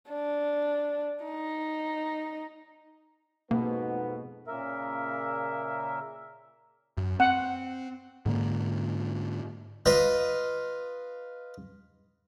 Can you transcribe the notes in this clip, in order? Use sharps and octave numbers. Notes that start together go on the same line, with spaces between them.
D4
D#4
F2 G#2 B2 A#3 B3
A#2 C#3 A#3 A#4 E5
F#2
C4 F#5
G#2 D3 A#3
F4 B4 D#5